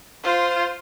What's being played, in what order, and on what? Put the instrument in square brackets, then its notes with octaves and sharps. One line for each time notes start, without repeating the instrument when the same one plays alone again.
[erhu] F4 [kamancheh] C5